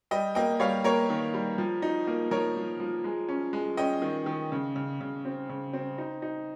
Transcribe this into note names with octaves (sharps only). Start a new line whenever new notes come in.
G3 D#5 G5
A#3 D#5 G5
G3 C#5 F5
A#3 A#4 C#5
D#3
G3
F3
D#4
A#3
F3 A#4 C#5
F3
F3
G#3
C#4
G#3
C#4 D#5 G5
D#3
D#3
C#3
C#3
C#3
C4
C#3
C4
D#4
D#4